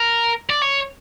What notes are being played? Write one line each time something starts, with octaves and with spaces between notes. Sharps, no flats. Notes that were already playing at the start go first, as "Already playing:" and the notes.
Already playing: A#4
D5
C#5